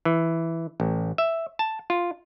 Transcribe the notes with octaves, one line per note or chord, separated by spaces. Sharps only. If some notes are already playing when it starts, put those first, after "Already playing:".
E3
A1
E5
A5
F4